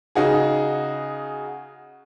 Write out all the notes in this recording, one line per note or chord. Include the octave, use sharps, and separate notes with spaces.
C#3 D#4 F#4 G#4